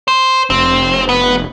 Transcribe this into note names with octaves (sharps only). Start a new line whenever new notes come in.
C5
F1 C4
B3